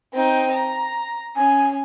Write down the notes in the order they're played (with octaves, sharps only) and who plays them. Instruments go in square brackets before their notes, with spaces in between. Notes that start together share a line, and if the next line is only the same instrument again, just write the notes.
[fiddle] C4 D#4
A#5
[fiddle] C#4 [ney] G#5